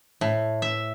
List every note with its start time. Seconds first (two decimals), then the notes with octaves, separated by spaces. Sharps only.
0.21 A2
0.62 E5